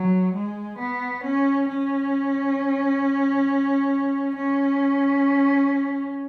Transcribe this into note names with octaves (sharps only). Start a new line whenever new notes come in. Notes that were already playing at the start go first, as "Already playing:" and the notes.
Already playing: F#3
G#3
B3
C#4
C#4
C#4